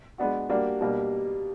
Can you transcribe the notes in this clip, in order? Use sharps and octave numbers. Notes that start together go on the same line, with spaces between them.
G#3 B3 D4 F#4
G3 A#3 D4 F#4
B2 G3 A#3 D4